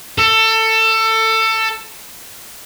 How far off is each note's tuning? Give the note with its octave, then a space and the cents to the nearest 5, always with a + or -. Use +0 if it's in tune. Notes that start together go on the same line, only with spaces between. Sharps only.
A4 +20